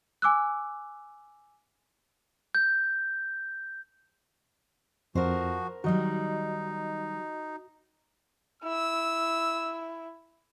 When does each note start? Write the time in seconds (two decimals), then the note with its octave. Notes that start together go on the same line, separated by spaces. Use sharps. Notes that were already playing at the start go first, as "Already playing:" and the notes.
0.22 G#5 D6 E6 F#6
2.55 G6
5.15 F2 F3 F#4 A#4 C5
5.84 D#3 F#3 G3 D#4 F#4 D#5
8.63 E4 E6